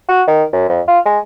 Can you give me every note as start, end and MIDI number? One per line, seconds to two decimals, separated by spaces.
0.09 0.23 66
0.27 0.44 51
0.53 0.68 42
0.69 0.81 41
0.88 0.99 65
1.06 1.19 56